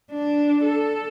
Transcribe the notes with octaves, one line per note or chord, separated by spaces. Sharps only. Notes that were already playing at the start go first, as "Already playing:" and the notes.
D4
A4